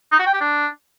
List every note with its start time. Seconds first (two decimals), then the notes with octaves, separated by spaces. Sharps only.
0.12 D#4
0.19 F#4
0.26 G5
0.34 G4
0.41 D4